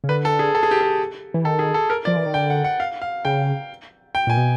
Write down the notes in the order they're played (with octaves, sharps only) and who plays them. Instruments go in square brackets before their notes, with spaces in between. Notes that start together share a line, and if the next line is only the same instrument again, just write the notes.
[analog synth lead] C#3
[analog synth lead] D3 [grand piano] B4
[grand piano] A4
G#4
A4
G#4
G4
G#4
[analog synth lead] E3
[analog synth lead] D#3 [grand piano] A4
[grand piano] G#4
A4
A#4
[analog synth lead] F3 [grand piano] D5
[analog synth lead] E3
D#3
[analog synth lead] D3 [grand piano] G5
[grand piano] F#5
F#5
F5
F5
[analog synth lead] C#3 [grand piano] G5
[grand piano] G5
[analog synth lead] A#2 [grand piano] G#5
[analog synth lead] B2